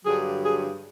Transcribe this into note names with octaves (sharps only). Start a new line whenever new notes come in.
G2 D3 F#3 G#4
G#4